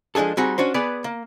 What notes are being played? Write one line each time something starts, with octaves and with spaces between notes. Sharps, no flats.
F3 G#3 D4 G#4 A4
G3 C4 D#4 F#4 G#4
C#4 D4 F#4 C5
B3 G#4 B4 D5
A#3